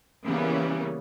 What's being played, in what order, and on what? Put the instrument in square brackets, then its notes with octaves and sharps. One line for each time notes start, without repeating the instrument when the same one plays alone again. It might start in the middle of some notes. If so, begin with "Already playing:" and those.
[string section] C#3 E3 G3 A#3 B3 C#4